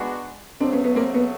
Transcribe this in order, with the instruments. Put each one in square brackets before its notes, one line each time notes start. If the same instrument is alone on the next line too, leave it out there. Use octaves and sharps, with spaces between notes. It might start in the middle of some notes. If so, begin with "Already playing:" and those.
Already playing: [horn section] G#3 B3 D4 F#4
[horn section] F#2 C#3 F#3 A3 [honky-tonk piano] C4 D4
[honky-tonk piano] B3 C#4
B3
A#3 C4
B3